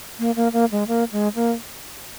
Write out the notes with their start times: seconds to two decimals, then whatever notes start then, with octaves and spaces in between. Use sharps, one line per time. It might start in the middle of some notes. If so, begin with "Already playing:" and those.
0.19 A#3
0.36 A#3
0.53 A#3
0.71 G#3
0.88 A#3
1.12 G#3
1.35 A#3